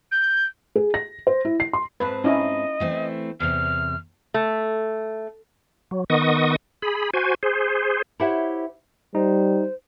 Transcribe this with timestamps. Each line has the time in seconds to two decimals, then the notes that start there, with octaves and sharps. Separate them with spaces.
0.12 G6
0.76 G#4
0.94 A#6
1.27 C5
1.45 E4
1.60 C7
1.73 C6
2.00 G#2 C4 B4 A5
2.24 C#4 D#4 E4 D#5
2.80 E3 A3 C4
3.40 E2 C3 F6
4.34 A3
5.91 F#3
6.10 D#3 B3 D#5 C#6 D#6
6.82 G#4 B5
7.14 F#4 C5 G#5
7.43 G#4 C5
8.20 E4 G4 C5 C#5 E5 F#5
9.15 G3 D#4 C5